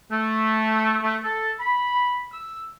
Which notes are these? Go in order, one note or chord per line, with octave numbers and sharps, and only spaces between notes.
A3
A3
A4
B5
E6